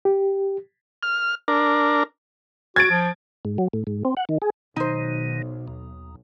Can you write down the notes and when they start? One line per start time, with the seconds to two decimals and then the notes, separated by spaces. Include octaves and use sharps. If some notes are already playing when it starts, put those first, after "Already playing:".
0.05 G4
1.03 F6
1.48 D4 A#4
2.76 F#4 G#6 A6 D7
2.90 F3
3.45 G#2
3.58 F#3
3.73 A2
3.87 G#2
4.05 C4
4.17 F#5
4.29 D#3
4.42 G#4
4.76 B1 B2 D#3 D#4 C5
5.68 D#2